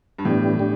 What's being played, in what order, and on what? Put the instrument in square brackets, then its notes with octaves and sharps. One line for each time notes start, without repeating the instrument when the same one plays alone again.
[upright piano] G2
[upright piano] A2 [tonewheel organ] E3 B3 D4 G4
[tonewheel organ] D4 G4